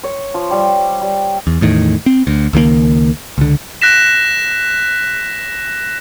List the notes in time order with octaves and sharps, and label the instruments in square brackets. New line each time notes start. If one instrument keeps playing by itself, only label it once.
[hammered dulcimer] C#5
F3
G3
G3
[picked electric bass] E2
E2 A2 D#3
C4
D2
C#2 D#3 F#3 A#3
C#2 D3
[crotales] F#6 A#6 B6 E7